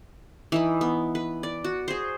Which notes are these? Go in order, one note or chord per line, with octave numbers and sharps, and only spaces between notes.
E3 D#4 B5
B3
B4
D5
F#4
G#4 C5